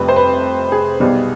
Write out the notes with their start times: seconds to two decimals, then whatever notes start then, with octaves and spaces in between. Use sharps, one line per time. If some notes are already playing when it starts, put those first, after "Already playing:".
Already playing: F1 F2 C3 G3 B4
0.08 C5
0.16 B4
0.72 G#4
1.00 B1 B2 G3